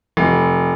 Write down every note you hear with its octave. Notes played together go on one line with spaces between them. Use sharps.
F1